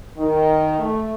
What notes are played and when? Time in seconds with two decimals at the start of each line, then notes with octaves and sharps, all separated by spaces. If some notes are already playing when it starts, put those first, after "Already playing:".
0.17 D#3
0.79 A3